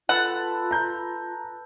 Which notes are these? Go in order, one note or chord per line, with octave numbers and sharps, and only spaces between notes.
F4 A4 B4 F#5 A5
A#5 G6